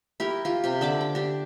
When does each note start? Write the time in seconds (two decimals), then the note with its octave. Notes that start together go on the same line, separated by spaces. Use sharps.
0.20 E4 G4 A#4
0.45 F4 G4
0.64 C3 G4
0.81 D3 E5 B5 D6
1.01 G5
1.15 D4 G4